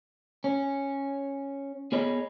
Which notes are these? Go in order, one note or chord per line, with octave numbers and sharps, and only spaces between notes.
C#4
B3 G#4 C#5 D#5 B5